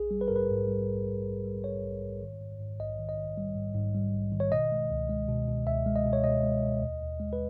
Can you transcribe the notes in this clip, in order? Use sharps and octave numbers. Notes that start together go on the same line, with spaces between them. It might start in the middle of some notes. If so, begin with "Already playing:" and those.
Already playing: A#1 G#4
G3
B4
G#2 A#4
B4
G#2
G3
A#1
A#1
A#1
G3
G#2 C#5
A#1
G#2
D#3
G#2
G#2
A#1 D#5
D#3
D#5
D#3
G3
G#2
G#2
G3
A#1
D#3
C#5
B2 D#5
G#3
C#2
G#3
B2
B2
C#2 E5
G#3
D#5
B2
C#5
B2 D#5
G#3
B2
D#2
D#2
G#3
B4